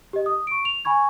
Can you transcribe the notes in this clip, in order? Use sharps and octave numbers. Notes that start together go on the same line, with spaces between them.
G4 D#5
D#6
C#6 D7
F7
G#5 B5 C#6 G#6